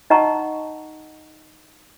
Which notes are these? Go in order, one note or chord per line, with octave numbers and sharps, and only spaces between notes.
D#4 D#5 F#5 A5 A#5 C#6